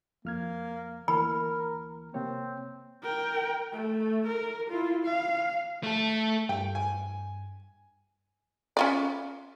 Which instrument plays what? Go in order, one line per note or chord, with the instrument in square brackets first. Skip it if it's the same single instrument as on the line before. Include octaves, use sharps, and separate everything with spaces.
[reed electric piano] F2 F6 G#6 [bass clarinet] A#3
[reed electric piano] D2 E3 A#3 [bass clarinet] A#4 [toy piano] B5
[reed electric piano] C3 A#3 C#5 [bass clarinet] C4
[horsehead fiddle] A#4 G5
A3
A#4
E4 F4
F5
[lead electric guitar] A3 A4
[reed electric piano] G2 [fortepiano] G5
[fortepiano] G#5
[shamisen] C#4 F4 D5